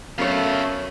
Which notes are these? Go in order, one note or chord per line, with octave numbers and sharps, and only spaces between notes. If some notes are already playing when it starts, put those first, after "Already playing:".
F#2 A3 B3 A4 C#5 F5